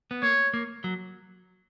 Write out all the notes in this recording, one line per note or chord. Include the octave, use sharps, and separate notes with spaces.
B3
A#3 C#5
A#3
F#3